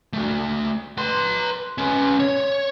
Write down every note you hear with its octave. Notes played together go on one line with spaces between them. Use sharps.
A3 F#4
B4 C6
C#4 B4
C#5